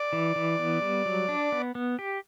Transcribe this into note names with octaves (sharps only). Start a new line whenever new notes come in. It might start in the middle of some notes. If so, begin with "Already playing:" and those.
Already playing: D5
E3
E3
B3
G3
F#3
D4
B3
B3
G4